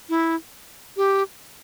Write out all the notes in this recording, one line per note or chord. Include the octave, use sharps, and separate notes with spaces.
E4
G4